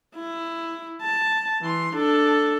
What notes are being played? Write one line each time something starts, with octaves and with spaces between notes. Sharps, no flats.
E4
A5
E3 C6
D4 A4